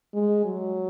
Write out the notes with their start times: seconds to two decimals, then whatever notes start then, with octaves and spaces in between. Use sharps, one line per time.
0.14 G#3
0.45 F#3